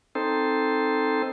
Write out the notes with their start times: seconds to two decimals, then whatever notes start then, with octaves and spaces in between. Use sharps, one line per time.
0.15 C4 D#4 A4 C5